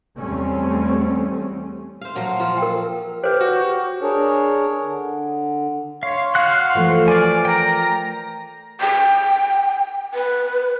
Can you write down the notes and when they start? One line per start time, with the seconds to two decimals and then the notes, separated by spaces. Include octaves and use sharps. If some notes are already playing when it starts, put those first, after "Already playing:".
0.18 E2 G3 A3 C4 C#4
2.01 C5 F5
2.15 A#2 F3 F#3
2.40 F3 F4
2.58 A#4 G5
3.24 G4 B4 C5
3.41 F#4
4.02 D4 G#4 A#4 C#5
4.82 D3
6.03 C#5 F5 C6
6.35 F#4 F5 F#5 F#6
6.75 E3 F3 A3
7.08 D5 G#5 F6
7.45 A#4 G5 A#5
8.81 G5
10.14 B4